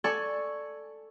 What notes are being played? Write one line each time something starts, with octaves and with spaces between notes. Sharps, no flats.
A4 D5 G#5 A5 C#6 E6